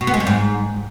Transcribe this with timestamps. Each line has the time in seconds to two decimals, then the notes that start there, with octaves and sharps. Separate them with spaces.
0.01 B2
0.07 B3
0.14 G#3
0.20 G3
0.27 G#2